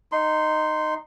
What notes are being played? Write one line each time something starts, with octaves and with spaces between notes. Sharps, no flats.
D#4 C6